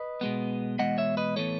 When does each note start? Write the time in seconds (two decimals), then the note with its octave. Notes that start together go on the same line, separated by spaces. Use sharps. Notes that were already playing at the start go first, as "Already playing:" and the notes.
Already playing: B4 D#5
0.21 B2 G#3 B3
0.78 E2 B2 G#3 B3 D#5 F#5
0.98 C#5 E5
1.17 B4 D#5
1.36 A2 E3 B3 A4 C#5